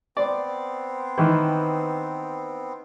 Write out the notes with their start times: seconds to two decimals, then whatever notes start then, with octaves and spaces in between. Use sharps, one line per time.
0.17 B3 C4 D5
1.18 D#3 E3